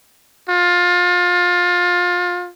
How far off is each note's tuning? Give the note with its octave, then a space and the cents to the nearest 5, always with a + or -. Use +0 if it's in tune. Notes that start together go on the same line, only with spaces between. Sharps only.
F4 +25